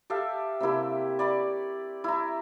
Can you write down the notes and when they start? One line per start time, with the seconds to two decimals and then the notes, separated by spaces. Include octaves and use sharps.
0.10 G4 A4 E5 F5
0.60 C3 A#3 E4 G4
1.19 D5 B5 C#6
2.04 E4 A#5